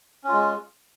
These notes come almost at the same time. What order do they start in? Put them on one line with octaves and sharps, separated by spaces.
C#4 F4 G#3